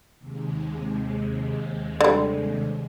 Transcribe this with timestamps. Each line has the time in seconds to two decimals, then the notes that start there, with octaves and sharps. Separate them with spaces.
0.17 D#2 C3 G#3
2.01 D3 G3